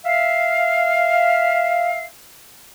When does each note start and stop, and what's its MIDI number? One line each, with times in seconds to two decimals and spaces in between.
0.06 2.04 76
0.06 2.04 77